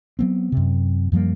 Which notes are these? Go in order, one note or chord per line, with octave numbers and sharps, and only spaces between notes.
F#3 B3 C4
F#2 C3
F#2 F3 G3 A#3